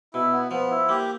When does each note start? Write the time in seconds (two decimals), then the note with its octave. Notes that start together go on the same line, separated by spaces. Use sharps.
0.14 B2 E4
0.32 B3
0.51 F3 B3
0.70 E4
0.89 A#3 G4